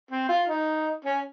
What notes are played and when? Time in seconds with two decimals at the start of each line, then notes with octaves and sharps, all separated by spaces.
0.11 C4
0.29 F4
0.48 D#4
1.05 C#4